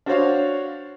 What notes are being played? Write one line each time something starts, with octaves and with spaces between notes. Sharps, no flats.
D4 F#4 C5 C#5 F5